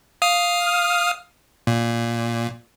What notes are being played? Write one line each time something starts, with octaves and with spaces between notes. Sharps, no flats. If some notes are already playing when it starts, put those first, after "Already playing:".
F5 D#6 F6
A#2